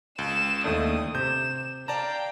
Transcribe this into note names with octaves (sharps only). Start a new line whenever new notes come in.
C#2 E7
D#2 A3 D4 D#6
C3 G6 E7
D5 F5 G5 A5 A#5